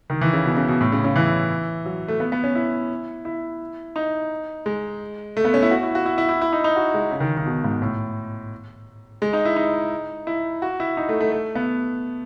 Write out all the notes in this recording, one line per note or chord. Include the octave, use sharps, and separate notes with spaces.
D#3
E3
C#3
B2
C#3
B2
A2
C#3
C#3
E3
F#3
A3
B3
B3
C#4
E4
E4
D#4
G#3
A3
B3
C#4
E4
F#4
E4
F#4
E4
E4
E4
E4
D#4
D#4
F#4
G#3
C#3
D#3
D#3
B2
G#2
A2
G#3
D#4
E4
D#4
E4
F#4
E4
D#4
A3
A3
A3
B3